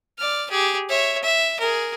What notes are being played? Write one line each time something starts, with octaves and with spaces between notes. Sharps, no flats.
D5 F6
G4 G#4
C#5 E5
E5
G#4 A#4